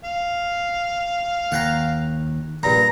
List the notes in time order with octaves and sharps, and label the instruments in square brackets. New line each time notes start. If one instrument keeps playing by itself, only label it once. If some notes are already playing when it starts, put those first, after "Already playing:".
[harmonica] F5
[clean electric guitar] D#2 [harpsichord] F#5 G5 A#5
[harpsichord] A#1 G2 [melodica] A#5